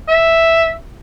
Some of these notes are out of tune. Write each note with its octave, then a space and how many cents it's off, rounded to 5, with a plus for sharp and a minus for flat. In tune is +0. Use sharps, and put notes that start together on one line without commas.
E5 +0